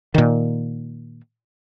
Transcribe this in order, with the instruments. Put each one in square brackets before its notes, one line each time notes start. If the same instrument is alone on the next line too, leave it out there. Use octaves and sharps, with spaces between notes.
[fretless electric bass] A#2 D#3